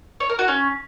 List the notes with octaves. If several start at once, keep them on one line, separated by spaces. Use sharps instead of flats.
C#5
A#4
F#4
C#4